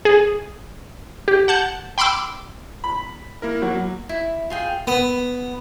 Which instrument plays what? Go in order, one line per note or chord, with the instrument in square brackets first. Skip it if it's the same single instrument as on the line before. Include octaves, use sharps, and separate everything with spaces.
[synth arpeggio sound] G#4
G4
F#5 A5 G6
G5 B5 C6 D6 E6
[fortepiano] B5
[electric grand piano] A#3 E4 A#4
[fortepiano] F#3
[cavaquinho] E4
F4 G#4 G5
[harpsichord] B3